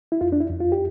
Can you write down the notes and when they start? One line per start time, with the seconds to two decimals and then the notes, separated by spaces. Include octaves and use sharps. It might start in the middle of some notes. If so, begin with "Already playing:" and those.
0.12 E4
0.21 F2 F4
0.32 D4
0.41 E4
0.50 F2
0.61 F4
0.72 G4